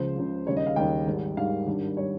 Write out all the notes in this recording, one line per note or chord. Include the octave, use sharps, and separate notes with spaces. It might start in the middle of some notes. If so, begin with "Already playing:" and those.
Already playing: C#2 C#3 F3 C5
C#2 C#3 F3
D#2 C#3 G3 C#5
D#5
F5
D#2 C#3 G3 G5
G#1 G#2 G3
G#1 G#2 G3 F5
G#1 G2 G3
G3 C#5